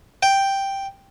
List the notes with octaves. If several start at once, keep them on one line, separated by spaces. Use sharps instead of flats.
G5